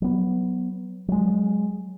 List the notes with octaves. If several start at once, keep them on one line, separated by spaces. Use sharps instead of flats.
F#3 B3
F#3 G#3